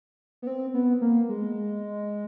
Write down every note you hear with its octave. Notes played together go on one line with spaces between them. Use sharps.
B3
C4
B3
A#3
G#3